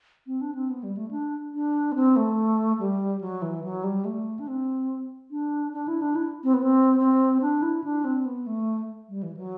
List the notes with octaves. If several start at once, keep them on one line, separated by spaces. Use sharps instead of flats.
C4
D4
C4
B3
G3
A3
D4
D4
B3
C4
A3
G3
F#3
E3
F#3
G3
A3
D4
C4
D4
D4
E4
D4
E4
C4
B3
C4
C4
D4
E4
D4
C4
B3
A3
G3
E3
F#3